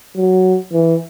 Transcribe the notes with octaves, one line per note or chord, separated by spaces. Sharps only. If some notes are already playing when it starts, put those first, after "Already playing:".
F#3
E3